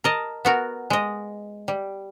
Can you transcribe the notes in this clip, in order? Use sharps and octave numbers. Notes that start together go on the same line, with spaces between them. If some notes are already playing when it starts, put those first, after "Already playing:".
A#4 D#5 A5
B3 F#4 A#4
G#3 D#5
G3